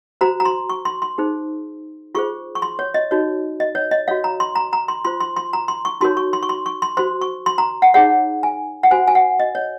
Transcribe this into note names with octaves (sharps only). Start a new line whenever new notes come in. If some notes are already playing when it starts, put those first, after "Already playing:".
F#4 C5 A#5
A#5
C6
C#6
C6
C6
D#4 G#4 C5
F4 G#4 C5 C#6
C#6
C6
C#5
D#5
D#4 F#4 C#5
D#5
C#5
D#5
F#4 C#5 F5
A#5
C6
A#5
A#5
C6
F4 C5 C6
C6
C6
A#5
C6
C#6
D#4 F#4 A#4 C#5 C6
C#6
C6
C#6
C6
C#6
C6
F#4 C5 C6
C#6
C6
A#5
F#5
D#4 G#4 C#5 F#5
G#5
F#5
F#4 C5 G#5
G#5
F#5
D#5
C#5